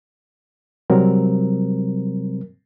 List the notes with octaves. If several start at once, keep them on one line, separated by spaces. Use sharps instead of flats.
C3 F#3 G3 C4 A#4